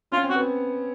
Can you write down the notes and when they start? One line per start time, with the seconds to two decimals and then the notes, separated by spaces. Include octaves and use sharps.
0.12 C#4 F4
0.24 C4
0.30 F#4
0.36 B3